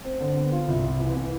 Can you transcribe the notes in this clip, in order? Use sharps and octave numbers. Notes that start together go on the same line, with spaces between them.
C4
D3
B3
F4
C2
C3
E3
E3